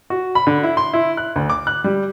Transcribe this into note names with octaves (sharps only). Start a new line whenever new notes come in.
F#4
B5
D3
E4
C6
E4
F#6
D2
D6
F#6
G3